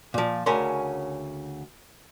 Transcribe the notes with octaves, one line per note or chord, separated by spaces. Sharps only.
A#2 F3
D2 C#3 C#4 A#4 C6